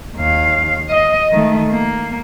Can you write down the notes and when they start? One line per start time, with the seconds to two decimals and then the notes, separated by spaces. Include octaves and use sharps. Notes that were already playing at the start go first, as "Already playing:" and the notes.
0.17 D#2 F5
0.90 D#5
1.31 D#3 A3
1.70 A#3